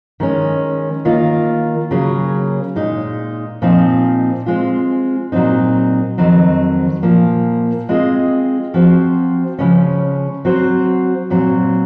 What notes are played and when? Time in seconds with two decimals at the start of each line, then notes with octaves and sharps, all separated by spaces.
0.20 D#3 G#3 C#4
1.05 D#3 A#3 F4 A#4
1.91 C#3 F#3 A#3 C#4 G#4
2.76 A#2 G#3 D#4
3.62 A#2 F3 C4 D#4
4.46 G#3 C4 F4
5.32 A#2 F#3 C4 D#4
6.18 F2 D#3 F#3 C4
7.03 A#2 F3 A#3
7.89 G#3 C4 F4 G#4 D#5
8.74 F3 C4 F#4 C5
9.59 C#3 F3 G#3 C#4
10.45 F#3 C4 F#4 C5
11.30 A#2 F#3 C4